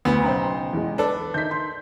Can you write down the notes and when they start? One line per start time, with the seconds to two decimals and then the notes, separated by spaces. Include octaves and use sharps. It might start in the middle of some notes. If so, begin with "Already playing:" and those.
0.05 D2 B3
0.24 B1 C#3 C5 G5 A#5
0.73 E2 G#3
0.98 D4 A4 B4
1.34 D#3 D#4 E5 G6 B6
1.51 C6